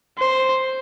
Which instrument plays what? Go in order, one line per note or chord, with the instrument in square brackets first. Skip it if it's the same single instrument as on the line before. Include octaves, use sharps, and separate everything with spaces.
[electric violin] C5